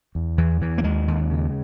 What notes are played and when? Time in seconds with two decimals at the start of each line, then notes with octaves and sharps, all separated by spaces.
0.15 E2
0.38 E2 E3
0.61 E2 E3
0.78 A#3
0.83 D#2 G#3
1.08 D#2
1.31 C#3